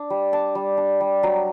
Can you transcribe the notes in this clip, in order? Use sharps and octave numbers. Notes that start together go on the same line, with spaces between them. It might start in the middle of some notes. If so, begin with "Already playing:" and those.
Already playing: D4
G3
D4 A5
G3
D4
G3
F#3 A#5